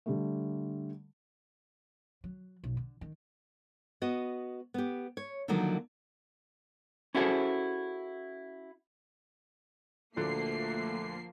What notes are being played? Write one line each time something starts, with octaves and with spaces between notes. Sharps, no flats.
D3 G3 A3
F#3
B1
D3
D#3
B3 F#4 D#5
B3 G4
C#5
D3 D#3 F3 F#3 A#3 D#4
C#4 E4 F#4 G#4 A4 C5
D2 A#2 D3 F3 A3 A#3 C7